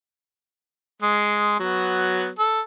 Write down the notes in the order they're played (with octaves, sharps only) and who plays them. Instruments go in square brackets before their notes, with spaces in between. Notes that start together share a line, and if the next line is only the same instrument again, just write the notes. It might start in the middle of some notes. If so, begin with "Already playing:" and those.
[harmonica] G#3
F#3 B3
A4